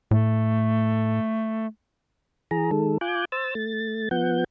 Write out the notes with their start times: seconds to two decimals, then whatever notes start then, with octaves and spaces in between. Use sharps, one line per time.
0.11 A2 A3
2.51 E3 G#4 A#5
2.71 D#3 G#3 A4
3.01 F4 G#5 D6 F#6 G6
3.32 C5 E6 A6
3.55 A3 A6
4.11 F3 B3 F#5 G6